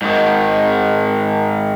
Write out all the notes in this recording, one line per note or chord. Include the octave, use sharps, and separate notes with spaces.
G#2 D#3